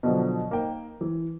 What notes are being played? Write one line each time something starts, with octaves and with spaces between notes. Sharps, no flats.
B2 D3 F3 F#3
A#3 D#4 G5
E3